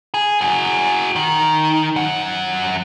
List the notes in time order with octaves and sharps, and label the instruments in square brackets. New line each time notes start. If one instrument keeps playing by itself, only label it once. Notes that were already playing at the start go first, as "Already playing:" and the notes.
[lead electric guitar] G#4
F#4 G#4
D#3
F#2 F#5